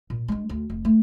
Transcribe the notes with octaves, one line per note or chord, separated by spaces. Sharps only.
A#2
G#3 D4
D2
F1
A3